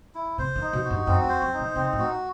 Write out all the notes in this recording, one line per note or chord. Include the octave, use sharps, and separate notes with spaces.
E4
C3 C5
D#3
D#4
B2
F#4
G2
F#2 C4
E2
C5
F#2
D#4
B2
C3 C4
A2
F#4